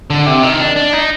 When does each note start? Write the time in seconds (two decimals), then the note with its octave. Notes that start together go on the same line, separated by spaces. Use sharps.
0.10 D3
0.26 C3
0.43 D#3
0.60 D4
0.76 D4
0.93 D#4